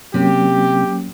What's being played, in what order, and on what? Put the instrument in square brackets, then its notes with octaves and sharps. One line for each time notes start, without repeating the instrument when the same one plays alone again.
[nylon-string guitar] C3 [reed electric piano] F#3 A#3 C#4 [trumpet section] G4